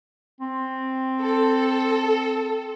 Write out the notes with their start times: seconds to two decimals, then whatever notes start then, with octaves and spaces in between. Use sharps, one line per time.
0.41 C4
1.21 A4